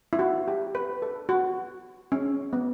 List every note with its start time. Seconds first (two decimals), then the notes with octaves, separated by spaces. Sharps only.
0.13 E4
0.19 F#4
0.48 G4
0.75 B4
1.02 A4
1.29 F#4
2.12 C#4
2.53 B3